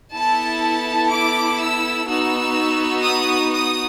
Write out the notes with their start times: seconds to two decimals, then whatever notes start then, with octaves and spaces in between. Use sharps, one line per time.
0.14 B3 E4 A4 A5
1.11 D6
1.60 E6
2.08 B3 D#4 F#4 E6
3.04 D#6
3.52 D#6